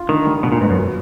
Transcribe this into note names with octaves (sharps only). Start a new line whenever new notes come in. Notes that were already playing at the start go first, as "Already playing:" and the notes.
Already playing: F4
D3 D#3
G3
D2 B2
A#2
G#2 B3
F#2
F#3